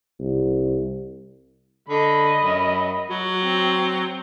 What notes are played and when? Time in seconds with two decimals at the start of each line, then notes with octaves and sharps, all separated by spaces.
0.20 C2
1.89 D3 D#5 B5
2.43 F#2
3.10 F#3 F#4
3.42 C4